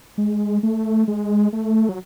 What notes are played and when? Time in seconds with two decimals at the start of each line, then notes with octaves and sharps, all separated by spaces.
0.18 G#3
0.63 A3
1.08 G#3
1.53 A3
1.89 F#3